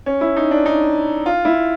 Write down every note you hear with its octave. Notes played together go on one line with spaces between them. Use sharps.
C#4
E4
D#4
D4
D#4
F4
E4